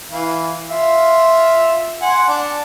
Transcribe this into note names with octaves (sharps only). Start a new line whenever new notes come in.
E3 F5
F4 E5 F5
F#5 G#5 C6
D4